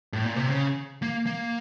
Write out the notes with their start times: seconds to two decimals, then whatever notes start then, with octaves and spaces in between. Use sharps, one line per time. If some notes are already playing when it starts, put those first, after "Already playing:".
0.13 A2
0.25 A#2
0.36 C3
0.49 C#3
1.02 A#3
1.26 A#3